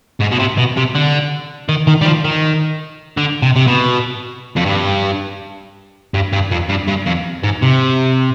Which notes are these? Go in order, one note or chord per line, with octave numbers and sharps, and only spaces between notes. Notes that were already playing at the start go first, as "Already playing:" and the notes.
G#2
B2
C3
B2
C3
D3
D#3
D#3
G3
F3
D#3
D3
C3
C3
B2
F2
G2
G2
G2
F2
G2
G2
F2
G#2
C3